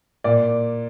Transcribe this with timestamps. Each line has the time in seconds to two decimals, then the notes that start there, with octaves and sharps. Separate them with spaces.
0.24 A#2 D5